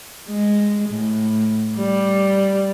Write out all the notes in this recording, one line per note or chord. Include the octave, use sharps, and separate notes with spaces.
G#3
A2
G3